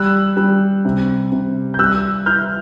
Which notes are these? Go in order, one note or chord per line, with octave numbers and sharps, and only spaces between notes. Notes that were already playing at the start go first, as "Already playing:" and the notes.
Already playing: G3 E6 F#6
G3
C3
C3
G6
G3 E6 F#6
E4 F6 G6